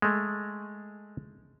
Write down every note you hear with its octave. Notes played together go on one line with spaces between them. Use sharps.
G#3 A3